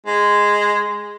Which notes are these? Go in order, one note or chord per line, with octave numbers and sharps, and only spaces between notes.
G#3